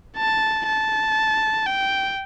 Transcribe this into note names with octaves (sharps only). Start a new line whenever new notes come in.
A5
A5
G5